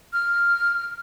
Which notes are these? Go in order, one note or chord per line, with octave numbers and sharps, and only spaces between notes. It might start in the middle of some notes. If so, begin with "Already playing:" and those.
F6